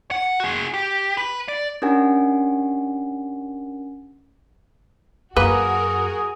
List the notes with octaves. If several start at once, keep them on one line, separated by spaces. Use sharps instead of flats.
F#5
F#4 G#4
G4
B4
D5
C#4 D4 G4 A#4 F#5 G#5
F#2 A#3 F#4 G#4 A#4 B4